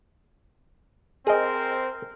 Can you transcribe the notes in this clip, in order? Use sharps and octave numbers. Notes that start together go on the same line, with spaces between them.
C4 G#4 A#4 C5 D#5